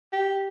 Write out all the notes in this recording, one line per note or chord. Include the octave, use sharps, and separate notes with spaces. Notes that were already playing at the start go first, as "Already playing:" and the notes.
G4